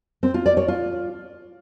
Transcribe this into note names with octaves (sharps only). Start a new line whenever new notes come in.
C4
F4
D5
C#5
F4